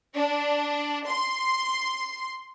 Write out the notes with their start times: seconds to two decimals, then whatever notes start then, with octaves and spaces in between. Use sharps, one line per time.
0.16 D4
1.08 C6